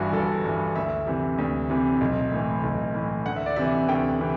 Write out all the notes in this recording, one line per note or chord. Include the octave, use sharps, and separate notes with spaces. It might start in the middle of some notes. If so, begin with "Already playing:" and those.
Already playing: G1 G2 E3 E4 F#4
G1 A4
G2 E3
D2 E5
C3 E3
D2
C3 E3
B1
A2 E3
B1
A2 E3
D2 F#5
E5
D5
C3 E3 E5
D2 G5
C3 E3